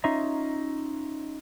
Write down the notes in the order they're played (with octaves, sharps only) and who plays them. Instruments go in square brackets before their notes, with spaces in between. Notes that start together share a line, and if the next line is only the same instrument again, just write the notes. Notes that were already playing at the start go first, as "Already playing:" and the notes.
[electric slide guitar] C#4 D#4 F4 D#5 E5 A#5